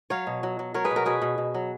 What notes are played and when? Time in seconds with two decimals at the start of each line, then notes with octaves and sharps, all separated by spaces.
0.10 F#3 C#5 F5
0.27 B2
0.43 F#3
0.59 F#3
0.74 F#3 A#4 C#5
0.84 G#4 B4
0.91 B2
0.96 F#4 A#4
1.06 B2 G#4 B4
1.22 B2
1.38 B2
1.55 F#3